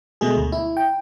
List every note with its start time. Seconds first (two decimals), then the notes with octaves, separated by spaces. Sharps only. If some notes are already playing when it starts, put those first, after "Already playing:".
0.21 B2 G#3 A3 G#4
0.37 D2
0.52 E4
0.77 G5